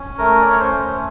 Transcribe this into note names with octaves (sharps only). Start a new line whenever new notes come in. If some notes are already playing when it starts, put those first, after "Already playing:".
Already playing: C#4
A3 A#4
D5
C#4 C#5
C5
A3